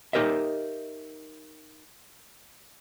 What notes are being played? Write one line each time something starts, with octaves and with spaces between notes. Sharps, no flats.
D#4 G4 A#4 D#5 E5